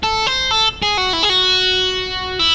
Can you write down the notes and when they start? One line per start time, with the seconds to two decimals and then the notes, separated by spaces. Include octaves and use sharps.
0.03 A4
0.27 C5
0.51 A4
0.82 G#4
0.98 F#4
1.13 E4
1.23 G#4
1.29 F#4
2.39 E4